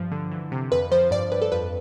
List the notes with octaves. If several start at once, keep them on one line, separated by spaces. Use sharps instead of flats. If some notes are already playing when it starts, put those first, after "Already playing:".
Already playing: G2 F3
D3
E3
C3
F2 B4
F3 C5
G2 D5
G2 B4
A4
F2 B4